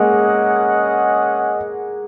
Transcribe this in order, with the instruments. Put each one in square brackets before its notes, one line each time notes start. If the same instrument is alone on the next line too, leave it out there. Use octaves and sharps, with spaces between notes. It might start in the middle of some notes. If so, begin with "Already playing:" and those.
Already playing: [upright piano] G#3 A#3 [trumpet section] C#4 G#4 D#5 F#5